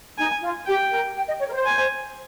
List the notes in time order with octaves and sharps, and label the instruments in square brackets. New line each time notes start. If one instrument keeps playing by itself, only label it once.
[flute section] D#4 [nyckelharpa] G#5
[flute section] F4
[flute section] G4 [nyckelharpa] G5
[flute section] A#4
G5
D#5
C#5
A#4
C5
[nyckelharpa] G#5